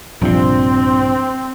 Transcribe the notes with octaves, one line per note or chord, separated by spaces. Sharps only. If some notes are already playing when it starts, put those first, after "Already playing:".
A#1 G2 C3 F3 C4 D4